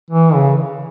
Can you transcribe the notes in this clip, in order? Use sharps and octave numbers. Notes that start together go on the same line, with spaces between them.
E3
C#3